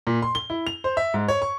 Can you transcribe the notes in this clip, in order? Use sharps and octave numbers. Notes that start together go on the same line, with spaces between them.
A#2
C6
G7
E4
F7
C5
E5
G#2
C#5
C#6